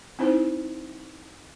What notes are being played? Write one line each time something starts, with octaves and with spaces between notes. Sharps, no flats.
C4 D#4 E4 C5